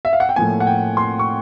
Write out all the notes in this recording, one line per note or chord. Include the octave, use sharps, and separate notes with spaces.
E5
F5
F#5
G5
A2 F3 A#3 G#5
F#5
G5
C6
C#6